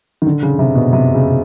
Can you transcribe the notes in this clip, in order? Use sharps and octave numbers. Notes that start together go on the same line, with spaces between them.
D#3
D3
C#3
C3
B2
C3
C#3